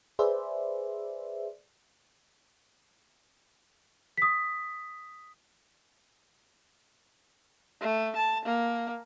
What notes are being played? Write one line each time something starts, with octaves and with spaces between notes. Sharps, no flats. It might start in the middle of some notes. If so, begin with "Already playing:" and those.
G#4 B4 C5 D5 E5
D#6 B6
A3
A5
A#3